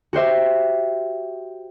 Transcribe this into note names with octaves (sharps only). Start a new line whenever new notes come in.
F#4 G4 C5 E5